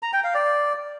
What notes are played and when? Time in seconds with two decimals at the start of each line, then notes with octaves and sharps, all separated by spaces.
0.03 A#5
0.13 G5
0.24 F5
0.34 D5